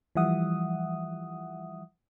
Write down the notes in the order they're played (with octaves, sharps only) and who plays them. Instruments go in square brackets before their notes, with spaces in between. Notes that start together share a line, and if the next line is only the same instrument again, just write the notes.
[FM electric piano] E3 F3 G3 E5 F#5 D#6